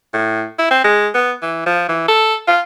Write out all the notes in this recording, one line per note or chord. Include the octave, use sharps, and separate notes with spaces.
A2
E4
C4
G#3
B3
E3
F3
E3
A4
F4